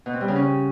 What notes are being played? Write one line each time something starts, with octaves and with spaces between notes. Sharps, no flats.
B2
C4
G3
C#3
C#4